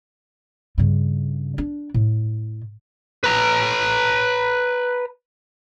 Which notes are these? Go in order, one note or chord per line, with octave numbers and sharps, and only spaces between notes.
G2 C#3
D4
A2
B4 A#5